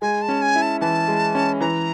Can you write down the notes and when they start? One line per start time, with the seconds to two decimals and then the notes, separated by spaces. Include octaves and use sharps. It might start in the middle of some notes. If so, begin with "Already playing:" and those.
0.02 G#3 G#5
0.22 A5
0.28 C#4
0.42 G#5
0.55 E4
0.62 A5
0.81 E3 A5
1.08 G#3
1.35 C#4
1.61 E3 A#5